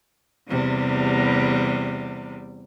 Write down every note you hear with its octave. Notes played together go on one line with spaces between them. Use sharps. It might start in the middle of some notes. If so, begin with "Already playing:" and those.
E2 C3 G3